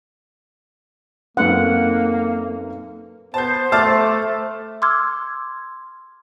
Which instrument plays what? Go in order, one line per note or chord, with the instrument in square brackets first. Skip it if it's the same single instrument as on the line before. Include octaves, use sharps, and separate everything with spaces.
[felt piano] F#2 C4 [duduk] A#3 [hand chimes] D#4 A4 B4 [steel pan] F#5
[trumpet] B3 [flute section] C5 [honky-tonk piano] A5 G6
[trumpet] A3 [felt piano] E5 F6 [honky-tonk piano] A5 D6 A6
[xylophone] C6 D6 E6 F6 G#6